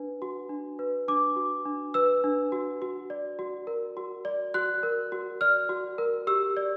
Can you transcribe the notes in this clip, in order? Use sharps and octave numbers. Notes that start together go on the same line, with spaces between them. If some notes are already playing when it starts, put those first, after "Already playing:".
Already playing: D4 B4
F#4
D4
B4
D4 D6
F#4
D4
B4 E6
D4
F#4
F#4
D5
F#4
A#4
F#4
D5
F#4 F#6
A#4
F#4
D5 F6
F#4
A#4
G4 E6
D5